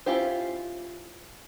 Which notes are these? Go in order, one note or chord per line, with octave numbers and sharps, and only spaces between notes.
C#4 E4 F4 G4 C5